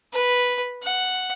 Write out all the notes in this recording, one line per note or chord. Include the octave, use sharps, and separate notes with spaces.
B4
F#5